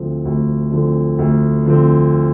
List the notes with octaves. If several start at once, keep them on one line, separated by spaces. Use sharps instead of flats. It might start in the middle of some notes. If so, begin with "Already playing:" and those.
Already playing: D2 D3 F3 C4
D2
D3 F3 C4
D2
D3 F3 C4